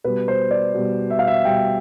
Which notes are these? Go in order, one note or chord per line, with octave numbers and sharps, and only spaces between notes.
B2 G3 B4
C5
D5
B2 G3
E5
F5
E5
B2 G3 G5